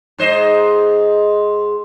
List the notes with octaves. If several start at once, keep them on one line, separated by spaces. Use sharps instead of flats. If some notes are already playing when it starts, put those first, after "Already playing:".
G#2 C5 D#5